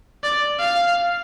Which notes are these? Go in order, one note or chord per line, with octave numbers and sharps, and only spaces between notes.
D5
F5